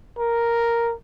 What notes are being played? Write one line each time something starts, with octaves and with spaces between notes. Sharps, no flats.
A#4